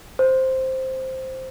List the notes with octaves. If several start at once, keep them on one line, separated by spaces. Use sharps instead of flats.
C5